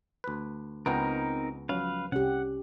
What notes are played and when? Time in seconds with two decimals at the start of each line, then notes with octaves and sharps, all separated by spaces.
0.24 D2 B4
0.86 C#2 B3 C4 D#4 A#4 G5
1.69 F3 F#3 C#4 B4 F5
2.12 C2 C#4 G4 F#5